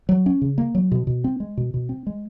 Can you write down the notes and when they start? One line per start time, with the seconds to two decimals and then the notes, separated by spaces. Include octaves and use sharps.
0.09 F#3
0.26 C#4
0.42 C#3
0.58 A#3
0.75 F#3
0.92 B2
1.07 B2
1.24 C4
1.40 G#3
1.57 B2
1.74 B2
1.89 C4
2.07 G#3